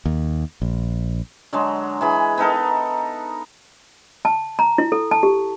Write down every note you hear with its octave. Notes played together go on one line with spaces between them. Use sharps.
D#2
A#1
D3 F#3 G#3
E3 G#4 B5
B3 D#4 A4 A#4
A5
A#5
E4
A4
A5
G4